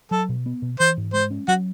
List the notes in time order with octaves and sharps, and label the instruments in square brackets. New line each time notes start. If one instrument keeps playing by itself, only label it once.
[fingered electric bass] F#3 [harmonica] A4
[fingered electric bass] B2
B3
B2
[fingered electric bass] E3 [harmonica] C5
[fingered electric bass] G#2
[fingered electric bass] G#3 [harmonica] C5
[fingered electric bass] C#4
[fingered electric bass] F#3 [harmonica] F#4